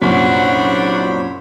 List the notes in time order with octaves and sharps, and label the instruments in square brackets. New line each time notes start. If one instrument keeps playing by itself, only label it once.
[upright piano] C2 F#2 A#2 [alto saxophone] D4 [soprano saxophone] F#4 [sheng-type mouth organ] C5 C#5 B5